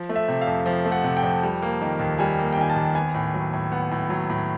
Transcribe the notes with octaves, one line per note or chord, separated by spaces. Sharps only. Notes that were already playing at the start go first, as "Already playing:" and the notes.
Already playing: F3
A3
E5
C3
F5
F2
F3 F5
A3
F#5
C3
G5
F2
G3
A#3
D#3
D#2
G3 G#5
A#3
G5
D#3 G#5
A5
D#2
B3 G#5
A2
F#3
A2
B3 F#5
A2
F#3
A2